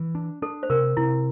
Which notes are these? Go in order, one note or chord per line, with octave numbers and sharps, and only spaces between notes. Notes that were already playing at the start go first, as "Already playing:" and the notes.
Already playing: E3
D4
D4 A4
C5
C3 A#4
C3 E4